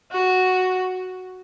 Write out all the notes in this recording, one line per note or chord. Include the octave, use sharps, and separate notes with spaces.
F#4